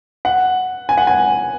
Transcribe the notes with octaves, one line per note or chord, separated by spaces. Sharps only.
F#5
G#5
F#5
G#5